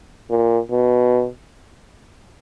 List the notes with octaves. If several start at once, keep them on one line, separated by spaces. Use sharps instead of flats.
A#2
B2